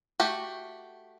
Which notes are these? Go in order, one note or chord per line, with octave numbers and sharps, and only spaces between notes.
A3 F#4 G4